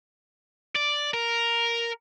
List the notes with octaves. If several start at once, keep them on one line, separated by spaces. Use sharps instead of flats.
D5
A#4